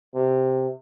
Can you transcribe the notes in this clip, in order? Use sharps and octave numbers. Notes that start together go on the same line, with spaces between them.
C3